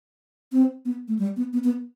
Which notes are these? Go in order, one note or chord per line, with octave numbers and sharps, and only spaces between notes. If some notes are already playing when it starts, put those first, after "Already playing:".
C4
B3
A3
G3
B3
B3
B3